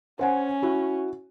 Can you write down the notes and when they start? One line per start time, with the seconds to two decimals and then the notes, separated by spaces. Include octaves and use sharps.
0.19 C#4 C5 F#5 G#5
0.62 E4 F#4